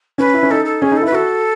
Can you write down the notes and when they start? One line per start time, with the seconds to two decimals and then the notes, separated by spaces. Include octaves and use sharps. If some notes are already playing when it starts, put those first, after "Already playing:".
0.18 C#4 B4
0.34 E4
0.43 C#4
0.51 D#4 A4
0.65 A4
0.82 C#4 G#4
0.91 D#4
0.96 A4
1.02 E4 B4
1.12 F#4 A4